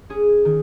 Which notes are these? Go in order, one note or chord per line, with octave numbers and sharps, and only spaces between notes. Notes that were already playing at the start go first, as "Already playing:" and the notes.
C#4 G#4
D#3